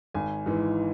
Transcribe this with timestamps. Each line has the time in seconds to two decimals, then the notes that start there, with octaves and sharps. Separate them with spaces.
0.14 G#1 G#5
0.46 G#2 E3